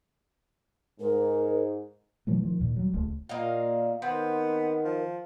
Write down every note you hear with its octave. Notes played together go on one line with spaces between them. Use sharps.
G#2 A#4
B2 E3 F#3 A3
D#3 F3
D#2 A#2 D#3
F#3 G3
D#1 C#2 A3
A#2 A#3 D#5 F5
D#3 B3 C4
F3